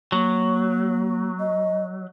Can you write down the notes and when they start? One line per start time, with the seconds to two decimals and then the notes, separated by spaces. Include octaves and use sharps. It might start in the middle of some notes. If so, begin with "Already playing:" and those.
0.12 F#3 A#3
1.40 D#5